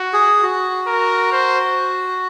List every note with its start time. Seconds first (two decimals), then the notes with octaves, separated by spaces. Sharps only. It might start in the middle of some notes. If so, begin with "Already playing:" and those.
Already playing: F#4
0.13 G#4
0.43 F#4
0.87 A#4
1.32 C5